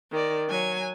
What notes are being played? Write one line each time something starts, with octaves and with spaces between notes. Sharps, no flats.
D#3 D5
F#3 G#5